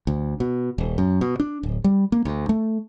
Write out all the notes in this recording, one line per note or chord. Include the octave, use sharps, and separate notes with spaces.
D2
B2
D#1
F#2
B2
D4
D1
G3
A#3
D2
A3